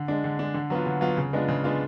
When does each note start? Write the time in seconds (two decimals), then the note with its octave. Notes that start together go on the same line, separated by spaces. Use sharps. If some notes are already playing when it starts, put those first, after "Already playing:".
Already playing: D3
0.08 G#3 D4
0.24 D3
0.39 G#3 D4
0.54 D3
0.70 F#3 B3 F4
0.86 D3
1.01 F#3 B3 F4
1.17 C#3
1.33 G#3 B3 D4 F4
1.48 C#3
1.64 G#3 B3 D4 F4